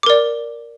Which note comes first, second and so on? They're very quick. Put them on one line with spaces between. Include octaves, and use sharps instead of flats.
D6 A#4 D5